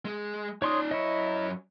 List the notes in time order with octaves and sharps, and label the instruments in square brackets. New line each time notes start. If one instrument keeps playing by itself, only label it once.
[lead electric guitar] G#3
[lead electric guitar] D#4 D5 [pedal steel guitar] C#5 C6 D#6
[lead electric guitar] F#2 C#5 [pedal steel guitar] E4 D#5